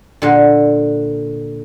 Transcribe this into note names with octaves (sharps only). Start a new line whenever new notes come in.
A#2 D3